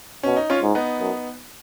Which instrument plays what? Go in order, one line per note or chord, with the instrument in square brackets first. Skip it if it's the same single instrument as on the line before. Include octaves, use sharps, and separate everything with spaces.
[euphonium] B2 [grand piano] C#4
[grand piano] D#4
C#4 F4
[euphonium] G#2
[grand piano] B3 D#4
[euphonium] F#2